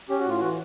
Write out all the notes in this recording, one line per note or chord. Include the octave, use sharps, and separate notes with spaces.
C#4 G4
F#4
A2 F4
E3 F#4